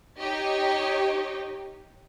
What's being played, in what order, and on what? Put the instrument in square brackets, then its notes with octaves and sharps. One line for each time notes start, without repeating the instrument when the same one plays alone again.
[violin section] D#4 G4 C#5 D#5